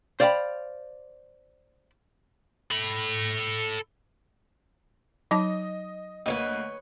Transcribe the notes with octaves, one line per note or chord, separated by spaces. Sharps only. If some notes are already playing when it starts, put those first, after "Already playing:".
C5 D5 F5 G5 A#5 B5
A4 B5
F#3 D#4 D#5 A5
D2 A#3 B4 C#5 D#5